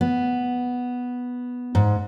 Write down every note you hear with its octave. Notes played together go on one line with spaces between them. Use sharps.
B3
G#2